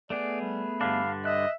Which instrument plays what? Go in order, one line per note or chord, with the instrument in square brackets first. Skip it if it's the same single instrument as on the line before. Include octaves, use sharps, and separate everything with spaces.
[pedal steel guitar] A3 B3 G#4 [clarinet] D5
[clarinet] G3 [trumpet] B5
[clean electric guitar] G2 D3 D4 [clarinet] F5
[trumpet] D#5 [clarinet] E5 [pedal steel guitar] F#6